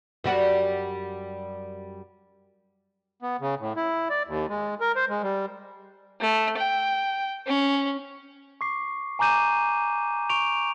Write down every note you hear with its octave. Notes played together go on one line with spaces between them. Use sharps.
F#2 G3 F#4
B3
C#3
A2
E4
D5
D#2
G#3
A#4
C5
G#3
G3
A3
G5
C#4
C#6 D6 C7
G#5 A#5 D6 G6 D#7 E7
C#6 D7 F7